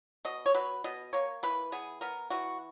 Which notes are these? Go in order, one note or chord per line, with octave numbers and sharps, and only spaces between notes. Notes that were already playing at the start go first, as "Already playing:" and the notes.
B2 D#5
C#5
F#3 B4
B2 D#5
A#3 C#5
E3 B4
B3 G#4
B3 A#4
E3 F#4